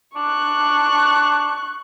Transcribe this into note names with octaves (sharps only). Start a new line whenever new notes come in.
D4 C#6 F#6